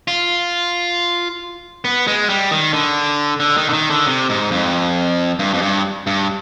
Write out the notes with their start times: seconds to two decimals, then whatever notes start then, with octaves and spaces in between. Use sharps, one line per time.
0.08 F4
1.85 B3
2.07 G#3
2.29 G3
2.51 D#3
2.73 D3
3.40 D3
3.57 D#3
3.69 D3
3.73 D#3
3.90 D3
4.07 C3
4.29 G#2
4.51 F2
5.39 G2
5.54 F2
5.62 G2
6.07 G2